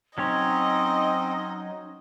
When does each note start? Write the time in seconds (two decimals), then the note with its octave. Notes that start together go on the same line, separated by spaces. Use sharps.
0.18 F#3 C4 C#4 D#4 C#5 D#5